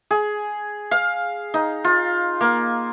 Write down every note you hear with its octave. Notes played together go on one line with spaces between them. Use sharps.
G#4
F5
D#4
F4
A#3